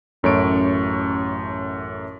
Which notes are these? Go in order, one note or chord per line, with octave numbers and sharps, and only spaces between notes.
A1 F#2 A3 C#5 C#6 D7